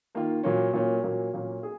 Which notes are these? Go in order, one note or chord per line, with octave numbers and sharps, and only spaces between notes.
D#3 A#3 F4
A#2 F#3 A#3 C#4
A#2 F#3 A#3 C#4
A#2 F#3 A#3 C#4
A#2 F#3 A#3 C#4
G#4